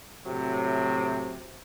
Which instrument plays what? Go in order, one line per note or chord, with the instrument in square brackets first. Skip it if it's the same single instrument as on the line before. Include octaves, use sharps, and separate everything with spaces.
[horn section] A2 C3 F#3